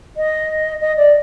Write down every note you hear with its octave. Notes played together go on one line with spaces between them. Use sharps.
D#5
D#5
D5